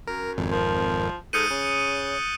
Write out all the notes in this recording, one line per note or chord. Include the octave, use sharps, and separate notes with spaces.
F#2 A#4
G#1 F2
F3 A#4
G#2 A4 D#6 F#6 G6 A6 C#7 D#7
C#3 C#5